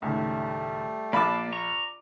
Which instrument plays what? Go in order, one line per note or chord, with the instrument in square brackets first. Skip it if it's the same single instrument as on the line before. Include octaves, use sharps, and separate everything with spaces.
[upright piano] C#2 A2 D#3 [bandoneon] G3 A3
[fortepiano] A#1 F5 B5 [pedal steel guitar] A#3 A5 [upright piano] D5 D6
[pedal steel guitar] A#5 C#6